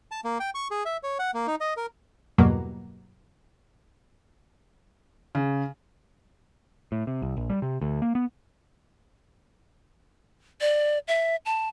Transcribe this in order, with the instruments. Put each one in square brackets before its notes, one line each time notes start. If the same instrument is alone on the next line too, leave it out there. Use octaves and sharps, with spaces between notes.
[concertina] A5
A#3
G5
C#6
G#4
E5
C#5
F#5
A#3
D#4
D#5
A#4
[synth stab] E2 G2 B2 F#3 A#3
[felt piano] C#3
[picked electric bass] A2
C3
C2
A#1
G3
C3
D2
A#3
B3
[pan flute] D5
E5
A5